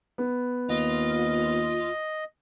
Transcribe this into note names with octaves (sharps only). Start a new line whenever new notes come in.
B3
D#2 F4 D#5